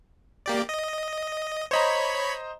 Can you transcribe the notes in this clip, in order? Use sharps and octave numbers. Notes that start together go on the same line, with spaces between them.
A#3 G4 D5
D#5
C5 C#5 D#5 A#5 B5